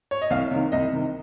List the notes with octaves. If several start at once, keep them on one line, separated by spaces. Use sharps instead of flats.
C#5
D#5
C2 F5
C3 D#3
C2 D#5
C3 D#3